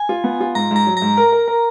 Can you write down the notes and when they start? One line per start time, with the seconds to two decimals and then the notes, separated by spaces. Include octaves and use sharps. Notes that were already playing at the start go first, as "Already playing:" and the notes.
Already playing: G#5
0.09 F4
0.24 B3
0.41 F4
0.55 G#2 A#5
0.71 G#2 A#5
0.87 F#3
0.97 A#5
1.02 G#2
1.17 A#4
1.32 A#4
1.48 A#4